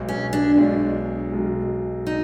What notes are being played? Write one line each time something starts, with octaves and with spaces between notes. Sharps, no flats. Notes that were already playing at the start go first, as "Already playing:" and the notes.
Already playing: B1 B2 G#3
C#4
D4
B1 B2 G#3
B1 B2 G#3
B2 D#4